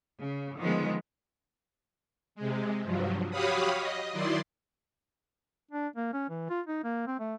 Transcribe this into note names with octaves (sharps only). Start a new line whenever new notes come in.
C#3
D3 D#3 F3 G#3 B3
C3 G#3
G2 F3 F#3
F#4 G4 C#5 F5 B5 D#6
D#5
D#3 F#3 E4 D5 C6
D4
A#3
C#4
E3
F4
D#4
A#3
C4
A3